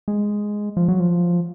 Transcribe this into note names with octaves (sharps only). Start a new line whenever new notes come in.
G#3
F3
F#3
F3